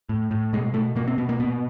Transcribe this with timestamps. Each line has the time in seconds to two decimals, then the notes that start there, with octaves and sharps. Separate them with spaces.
0.09 A2
0.31 A2
0.53 B2 G#3
0.74 B2 A3
0.96 B2 A#3
1.08 C4
1.18 B2 B3
1.29 A#3
1.40 A#2 B3